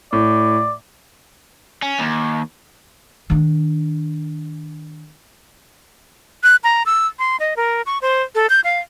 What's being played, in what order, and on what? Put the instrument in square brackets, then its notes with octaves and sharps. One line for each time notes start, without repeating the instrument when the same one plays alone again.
[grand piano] A2 [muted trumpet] D5
[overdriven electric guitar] C#4
D#2
[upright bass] D#3 D4
[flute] F#6
A#5
E6
C6
D#5
A#4
C#6
C5
A4
G6
F5